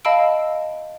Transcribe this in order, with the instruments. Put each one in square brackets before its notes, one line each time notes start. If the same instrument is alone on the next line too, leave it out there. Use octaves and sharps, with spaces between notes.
[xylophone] D#5 F5 A5 B5 E6 D7